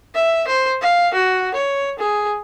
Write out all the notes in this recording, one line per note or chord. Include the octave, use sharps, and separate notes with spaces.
E5
C5
F5
F#4
C#5
G#4